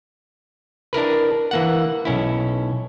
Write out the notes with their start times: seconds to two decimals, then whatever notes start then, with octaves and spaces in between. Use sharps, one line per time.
0.93 D4 E4 A#4 B4
1.51 E3 A#3 F#5
2.05 B1 C#4 E4